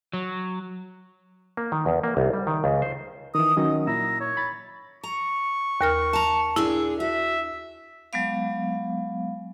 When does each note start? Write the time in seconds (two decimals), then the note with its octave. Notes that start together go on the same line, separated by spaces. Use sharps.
0.13 F#3
1.57 A#3
1.72 D#3
1.86 E2
2.03 A#3
2.17 C2
2.33 G3
2.47 D#3
2.64 C#2
2.82 C5
3.35 D#3 E3 D#6
3.57 D#3 F#3 C#4 D#5
3.87 A#2 E4 A#5 E6
4.20 C#5
4.37 B5 A6
5.04 A#5 C#6
5.81 D#2 A#4 F6
6.13 A5 A#5
6.56 A#2 D4 E4 G#4
7.00 F#4 E5
8.13 F#3 G#3 B3 F5